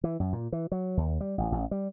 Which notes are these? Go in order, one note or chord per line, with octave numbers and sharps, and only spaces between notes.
E3
F#2
A#2
E3
F#3
D#2
G3
A1
A1
G3